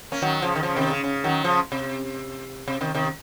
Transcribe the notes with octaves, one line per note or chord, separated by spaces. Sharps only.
A#3 C#4
D#3 F#3
C#3 F3
D#3
C#3 F3
C3 D#3
C#3
C#3
D#3 F#3
C#3 F3
C3
C3
C3 D#3
C3 D#3